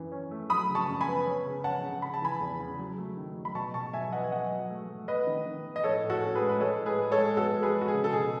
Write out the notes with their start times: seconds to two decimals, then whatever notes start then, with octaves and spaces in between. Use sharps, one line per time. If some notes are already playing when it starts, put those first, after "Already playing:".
Already playing: F#2 E3
0.12 C#4
0.31 A3
0.50 F#3 B5 D#6
0.69 C#3
0.75 A5 C#6
0.88 F#2
1.01 G#5 B5
1.07 B3
1.26 C#4
1.45 C#3
1.64 C#4 F#5 A5
1.83 C#3
2.02 C#3 B5
2.14 A5
2.22 E3 G#5 B5
2.40 E2
2.60 C#3
2.79 F#3
2.98 A3
3.17 D#3
3.36 F#3
3.45 B5
3.55 B2 A5 C#6
3.74 B2 A5 C#6
3.93 F#3 E5 G#5
4.12 B3 D#5 F#5
4.24 G#5
4.31 F#3 D#5 F#5
4.51 F#3
4.70 A3
4.89 A3
5.08 B3 B4 D#5
5.27 D#3
5.46 D#3
5.65 B3
5.76 D#5
5.84 A2 A4 C#5
6.03 A2
6.10 F#4 A4
6.23 C#4
6.35 G#4 B4
6.42 G#3
6.49 B4
6.60 G#3 A4 C#5
6.79 A2
6.86 G#4 B4
6.99 G#3
7.11 A4 C#5
7.18 G#3
7.37 B3 F#4 A4
7.56 G#3
7.63 G#4 B4
7.75 B3
7.81 F#4
7.88 G#4
7.94 C#3
8.04 A4
8.13 B2 G#4